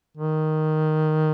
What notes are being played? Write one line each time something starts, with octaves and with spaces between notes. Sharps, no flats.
D#3